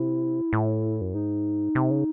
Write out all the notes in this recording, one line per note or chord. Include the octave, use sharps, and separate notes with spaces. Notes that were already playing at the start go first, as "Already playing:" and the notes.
Already playing: C3 E4
A2
F#2
G#2 D#4
C3
C#3